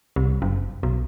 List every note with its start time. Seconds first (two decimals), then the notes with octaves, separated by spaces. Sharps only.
0.16 C2
0.42 F#1
0.83 B1